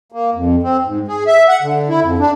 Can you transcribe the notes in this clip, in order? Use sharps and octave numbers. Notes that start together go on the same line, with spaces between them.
A#3
F2
C4
G#2
G#4
E5
F#5
D3
E4
F2
D4